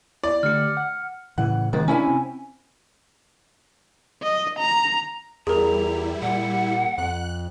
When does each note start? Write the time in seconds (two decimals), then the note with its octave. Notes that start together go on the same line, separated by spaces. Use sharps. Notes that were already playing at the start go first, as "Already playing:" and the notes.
0.24 E4 D5
0.43 D3 A3 G4 F6 C#7
0.77 F#5
1.38 A2 C#3 E3 F#5
1.73 C3 D#3 G#3 A#3
1.88 C3 C#4 D4 E4 G#5
2.08 C4
4.23 D#5
4.59 A#5
5.47 E2 G3 E4 G#4 A#4 A#5
6.22 A#2 F#5
6.98 F2 F#6